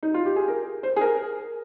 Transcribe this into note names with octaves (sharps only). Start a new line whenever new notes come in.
D#4
F4
G4
G#4
A#4
C5
G#4
A#4